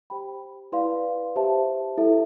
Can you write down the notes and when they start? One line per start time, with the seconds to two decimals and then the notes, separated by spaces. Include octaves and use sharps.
0.10 G4 C5 G5 B5
0.72 E4 B4 D5 F5 C6
1.36 G4 C5 E5 A5
1.98 E4 A4 E5